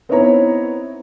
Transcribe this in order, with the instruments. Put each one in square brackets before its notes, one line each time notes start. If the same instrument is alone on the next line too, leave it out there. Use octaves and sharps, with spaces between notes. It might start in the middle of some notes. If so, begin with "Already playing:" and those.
[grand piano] B3 C4 D#4 E4 C#5 A#5